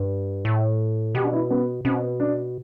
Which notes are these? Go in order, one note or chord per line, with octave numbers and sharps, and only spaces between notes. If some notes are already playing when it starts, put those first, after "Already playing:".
Already playing: G2
A2
B2 G4
D4
E4
B3
B2 C4
D4